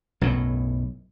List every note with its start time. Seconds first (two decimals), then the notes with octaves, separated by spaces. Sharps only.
0.21 B1 F#2 A2